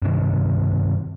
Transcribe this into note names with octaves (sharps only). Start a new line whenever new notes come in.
G2 C3 D#3